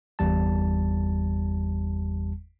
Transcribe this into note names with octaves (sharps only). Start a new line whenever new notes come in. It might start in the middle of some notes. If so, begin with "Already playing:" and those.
G1 E2 G3 A5